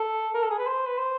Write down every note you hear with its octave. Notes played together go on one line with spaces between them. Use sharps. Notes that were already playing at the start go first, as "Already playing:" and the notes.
Already playing: A4
A#4
A4
G#4
B4
C5
B4
C5